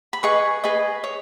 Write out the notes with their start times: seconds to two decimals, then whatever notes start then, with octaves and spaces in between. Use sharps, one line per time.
0.13 B5
0.23 G#4 B4 D#5 C#6
0.64 G#4 B4 D#5
1.04 C#5